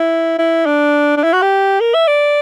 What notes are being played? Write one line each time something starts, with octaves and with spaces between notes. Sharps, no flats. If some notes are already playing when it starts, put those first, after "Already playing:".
Already playing: E4
E4
D4
D4
E4
F#4
G4
A#4
E5
D5